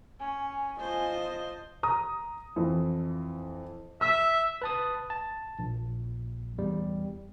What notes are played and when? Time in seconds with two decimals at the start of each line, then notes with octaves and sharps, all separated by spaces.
0.20 C#4 G#5
0.79 F4 C5 D#5 A5
1.83 A#5 D#6
2.56 F2 E3
4.01 E5 E6
4.62 B4 A5 D#6
5.10 A5
5.59 A#1
6.58 E2 G3